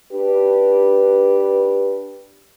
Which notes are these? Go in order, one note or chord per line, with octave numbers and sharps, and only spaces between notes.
D4 G4 B4